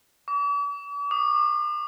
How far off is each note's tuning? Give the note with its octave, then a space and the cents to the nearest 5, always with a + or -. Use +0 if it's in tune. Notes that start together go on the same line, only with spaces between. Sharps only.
D6 -45
D6 +45